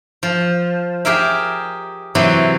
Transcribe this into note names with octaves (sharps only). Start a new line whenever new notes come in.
F3
G4 G#4 A#4 E5
C3 E3 F#3